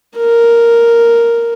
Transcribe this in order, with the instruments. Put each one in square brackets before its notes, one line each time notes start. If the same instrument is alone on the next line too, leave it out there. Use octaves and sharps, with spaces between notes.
[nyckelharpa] A#4